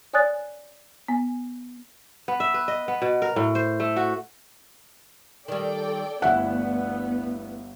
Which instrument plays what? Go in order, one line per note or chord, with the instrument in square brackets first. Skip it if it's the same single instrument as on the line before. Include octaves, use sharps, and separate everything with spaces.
[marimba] C#5 D5 G#5 D#6 F#6 A6
B3 G#5
[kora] B3
E5
B4
D#5
B3
B2
A#4
A2
C5
A3
F#4
[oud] D#3 G3 [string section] A4 D5 G5
[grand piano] G1 E5 [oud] D2 E4 [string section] B3 [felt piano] F#5